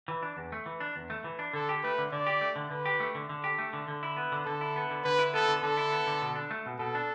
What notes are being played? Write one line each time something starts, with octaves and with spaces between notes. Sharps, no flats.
E3
D4
E2
A3
E3
D4
E2
A3
E3
D4
D3 A4
G4
A3 B4
D3
D3 D5
G4
A3
D3
D3 B4
G4
A3
D3
D3 A4
G4
A3
D3
D3
E4
B3
D3
D3 A4
E4
B3
D3
D3 B4
E4
B3 A4
D3
D3 A4
E4
B3
D3
B2
D4
A3
B2
B2 A4
D4